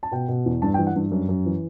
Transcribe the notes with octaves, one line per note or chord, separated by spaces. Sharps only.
A5
B2 G5
B2
E2
G2 A5
G5
E3
F#5
G2
F#2
F#2
E3